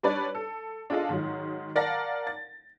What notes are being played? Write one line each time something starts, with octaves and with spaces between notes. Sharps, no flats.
G3 D4 B4 C#5 D5
A4
D4 F4 G#4 A4 D#5 F5
G#2 D#3 F#3
A#4 D5 F5 F#5 A5 A#6
A6